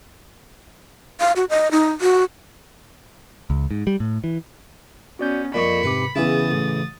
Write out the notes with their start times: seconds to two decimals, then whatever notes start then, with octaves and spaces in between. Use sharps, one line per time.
1.20 F5
1.36 F#4
1.50 D#5
1.71 D#4
2.01 F#4
3.50 C#2
3.71 G#2
3.87 G3
4.00 A2
4.24 E3
5.19 B3 C#4 F#4 D5 G6
5.54 F2 A#2 D5 D#5 B5 C#6 C#7
5.83 G#2 C3 B4 D6
6.16 E2 C#3 E3 E4 D#6 A6
6.51 A1